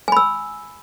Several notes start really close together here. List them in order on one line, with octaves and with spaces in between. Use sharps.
G#5 B5 E6